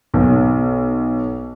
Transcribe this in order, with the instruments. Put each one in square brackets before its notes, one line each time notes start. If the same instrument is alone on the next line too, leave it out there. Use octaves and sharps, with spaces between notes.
[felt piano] B1